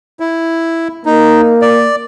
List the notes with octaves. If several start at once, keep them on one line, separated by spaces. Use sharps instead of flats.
E4
A#3 D#4
D5